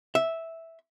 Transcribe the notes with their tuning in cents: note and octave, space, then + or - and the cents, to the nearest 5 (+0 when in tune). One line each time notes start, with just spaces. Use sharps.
E5 -5